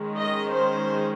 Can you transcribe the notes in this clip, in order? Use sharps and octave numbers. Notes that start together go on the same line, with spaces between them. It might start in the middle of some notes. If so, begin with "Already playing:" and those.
Already playing: D#3 G#3 C#4
D#5
C5